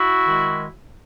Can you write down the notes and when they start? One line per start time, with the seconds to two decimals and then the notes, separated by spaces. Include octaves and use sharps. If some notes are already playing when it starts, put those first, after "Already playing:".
Already playing: E4 F#4
0.26 D#3 G#3